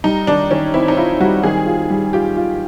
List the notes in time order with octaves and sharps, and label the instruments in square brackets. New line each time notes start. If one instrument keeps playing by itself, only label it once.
[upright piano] G3 [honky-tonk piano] D#4
[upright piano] D#3 [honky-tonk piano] D4
[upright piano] D#3 [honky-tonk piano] C#4
[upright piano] C4 [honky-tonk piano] E4
[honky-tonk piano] D#4
[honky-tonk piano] E4 [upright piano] F4
[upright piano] G3 [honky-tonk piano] F#4
[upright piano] D#3 [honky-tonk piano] G#4
[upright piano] F4
G3
[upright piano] F4 [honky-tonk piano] G4
[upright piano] F4